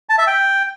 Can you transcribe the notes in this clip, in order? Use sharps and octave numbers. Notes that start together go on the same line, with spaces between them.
A5
E5
G5